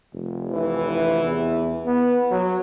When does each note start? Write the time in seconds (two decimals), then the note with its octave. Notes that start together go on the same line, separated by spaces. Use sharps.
0.14 F1
0.51 E3
1.24 E2
1.86 B3
2.31 F#3